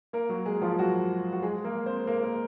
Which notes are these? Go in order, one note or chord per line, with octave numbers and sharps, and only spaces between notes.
A#3 A#4
F#3 F#4
G#3 G#4
F3 F4
F#3 F#4
F#4
G#3 G#4
A#3 A#4
C4 C5
A#3 A#4
A#3 A#4